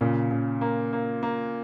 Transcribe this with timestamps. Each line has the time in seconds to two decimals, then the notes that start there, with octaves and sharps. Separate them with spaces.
0.01 A#2 C#3
0.31 C#3
0.61 A#3
0.93 A#3
1.23 A#3